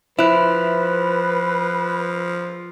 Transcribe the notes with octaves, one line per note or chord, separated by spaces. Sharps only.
F3 E4 B4 C5 F#6